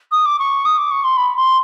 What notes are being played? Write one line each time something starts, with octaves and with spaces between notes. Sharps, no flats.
D#6
D6
C#6
D#6
D6
C#6
C6
B5
C6